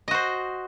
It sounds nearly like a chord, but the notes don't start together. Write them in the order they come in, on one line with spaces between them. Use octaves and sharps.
D#5 F#4 C5